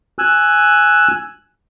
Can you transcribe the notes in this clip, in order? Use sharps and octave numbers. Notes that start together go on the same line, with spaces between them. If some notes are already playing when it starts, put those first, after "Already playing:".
G#5 E6 F#6